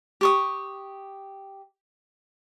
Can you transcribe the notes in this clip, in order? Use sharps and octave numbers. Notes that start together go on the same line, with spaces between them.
G4 C#6 D#6